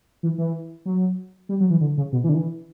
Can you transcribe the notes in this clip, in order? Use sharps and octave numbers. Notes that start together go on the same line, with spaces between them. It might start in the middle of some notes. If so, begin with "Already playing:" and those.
E3
E3
F#3
G3
F#3
E3
D3
C#3
B2
E3
D3
E3